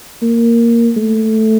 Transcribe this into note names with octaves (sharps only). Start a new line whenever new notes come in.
A#3
A3